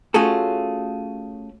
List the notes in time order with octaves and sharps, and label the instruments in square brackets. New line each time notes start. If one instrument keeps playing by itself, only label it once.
[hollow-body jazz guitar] A3 C#4 F4 F#4 G#4 A4